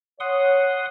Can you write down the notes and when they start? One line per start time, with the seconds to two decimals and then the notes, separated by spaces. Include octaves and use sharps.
0.20 C#5 F#5 C6 D#6